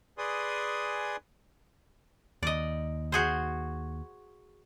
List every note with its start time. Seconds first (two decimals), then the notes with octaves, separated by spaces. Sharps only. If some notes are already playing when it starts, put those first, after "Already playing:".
0.18 G#4 B4 D5 G#5 C6 D#6
2.43 D#2 D5 D#5
3.12 F#4 G#4 C5